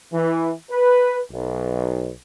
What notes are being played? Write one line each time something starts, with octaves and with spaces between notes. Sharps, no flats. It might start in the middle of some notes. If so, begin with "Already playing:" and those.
E3
B4
B1